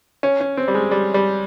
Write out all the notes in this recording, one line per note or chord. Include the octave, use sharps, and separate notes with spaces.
C#4
C#4
C4
G3
G#3
G3
G3